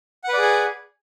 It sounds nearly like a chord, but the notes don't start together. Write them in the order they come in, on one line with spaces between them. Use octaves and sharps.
F#5 B4 D5 G#4 G#5